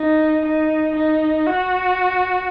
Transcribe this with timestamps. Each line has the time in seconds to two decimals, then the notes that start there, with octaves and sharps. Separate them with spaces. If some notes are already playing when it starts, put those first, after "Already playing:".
Already playing: D#4
0.45 D#4
0.95 D#4
1.47 F#4